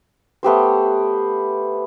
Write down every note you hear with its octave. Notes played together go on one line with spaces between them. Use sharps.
A3 B3 G4 C5